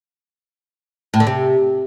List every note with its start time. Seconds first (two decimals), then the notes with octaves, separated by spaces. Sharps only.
1.14 A2
1.20 D3
1.27 C3